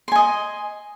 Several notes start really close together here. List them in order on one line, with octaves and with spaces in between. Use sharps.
C6 G#5 D#5